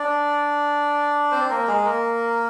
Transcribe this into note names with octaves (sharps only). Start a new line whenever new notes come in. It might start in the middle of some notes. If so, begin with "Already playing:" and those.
Already playing: D4 D5
C4 C5
A#3 A#4
G#3 G#4
A#3 A#4